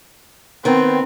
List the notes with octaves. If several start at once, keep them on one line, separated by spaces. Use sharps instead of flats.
D#3 B3 C4